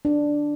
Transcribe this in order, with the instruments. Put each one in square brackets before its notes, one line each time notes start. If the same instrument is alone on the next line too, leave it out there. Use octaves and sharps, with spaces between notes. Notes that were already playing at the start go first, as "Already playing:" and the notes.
[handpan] D4